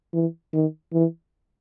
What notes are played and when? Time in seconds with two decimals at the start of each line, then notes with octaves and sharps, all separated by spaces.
0.14 E3
0.53 D#3
0.93 E3